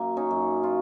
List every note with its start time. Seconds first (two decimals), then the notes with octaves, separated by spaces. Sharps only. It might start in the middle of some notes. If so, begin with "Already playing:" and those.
Already playing: F#2 A#3
0.17 C#4 D#4
0.31 F#2
0.63 F4